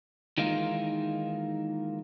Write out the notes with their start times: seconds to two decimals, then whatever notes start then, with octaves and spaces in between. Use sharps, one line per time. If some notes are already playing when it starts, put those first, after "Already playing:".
0.38 D#3 E3 G#3 A#3 D#4 F4